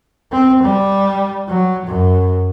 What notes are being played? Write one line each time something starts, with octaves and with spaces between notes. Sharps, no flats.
C4
G3
F#3
F#2